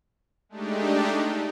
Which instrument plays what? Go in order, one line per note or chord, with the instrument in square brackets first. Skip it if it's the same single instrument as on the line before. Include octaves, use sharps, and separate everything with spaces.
[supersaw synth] G#3 A3 D4 D#4 G4